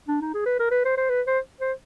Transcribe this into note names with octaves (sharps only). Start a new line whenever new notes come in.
D4
D#4
G#4
B4
A#4
B4
C5
C5
B4
C5
C5